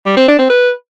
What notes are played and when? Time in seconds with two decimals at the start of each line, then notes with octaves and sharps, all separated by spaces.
0.06 G3
0.17 C4
0.28 D4
0.39 C4
0.49 B4